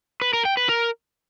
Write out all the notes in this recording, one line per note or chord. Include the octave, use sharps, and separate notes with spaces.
B4
A#4
G5
B4
A#4